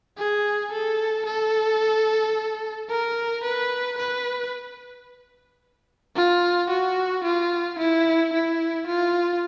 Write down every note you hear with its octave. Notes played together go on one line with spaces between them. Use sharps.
G#4
A4
A4
A#4
B4
B4
F4
F#4
F4
E4
E4
F4